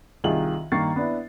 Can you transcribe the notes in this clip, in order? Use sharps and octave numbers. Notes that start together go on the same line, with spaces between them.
C2 D#3 F4 G#4 D#5 F#7
G2 D#3 A#3 C#6 A6 C7
B3 D4 E4